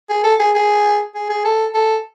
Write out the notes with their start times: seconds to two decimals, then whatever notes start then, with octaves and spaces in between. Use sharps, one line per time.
0.10 G#4
0.24 A4
0.40 G#4
0.55 G#4
1.15 G#4
1.30 G#4
1.45 A4
1.75 A4